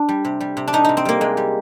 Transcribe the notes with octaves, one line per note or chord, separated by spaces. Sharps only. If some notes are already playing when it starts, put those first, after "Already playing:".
Already playing: D4
G3
C3
G3
C3
D4
G3 D#4
C3 D#4
C4
G3 A#3
C3 G#3
G3